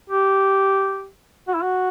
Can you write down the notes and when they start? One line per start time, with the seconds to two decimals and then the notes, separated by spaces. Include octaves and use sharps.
0.10 G4
1.48 F#4
1.55 E4
1.63 F#4